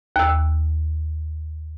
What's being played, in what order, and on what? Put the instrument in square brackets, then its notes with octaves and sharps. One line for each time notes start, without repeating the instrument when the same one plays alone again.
[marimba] D#2 E6